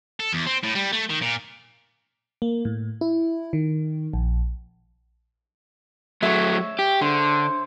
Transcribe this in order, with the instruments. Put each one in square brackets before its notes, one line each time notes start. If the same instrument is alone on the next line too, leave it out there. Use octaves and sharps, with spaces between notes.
[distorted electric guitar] A4
E2
C4
A2
G3
A3
D#3
A#2
[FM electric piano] A#3
A2
E4
D#3
A#1
[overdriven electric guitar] F#3 A3 [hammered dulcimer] C#5 E5
[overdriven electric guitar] G4
[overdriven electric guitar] D3 [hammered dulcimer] C5